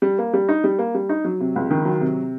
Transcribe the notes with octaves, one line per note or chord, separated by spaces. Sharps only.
G3
A#3
G3
D#4
G3
A#3
G3
D#4
F#3
C3
C#2
D#3
F#3
C3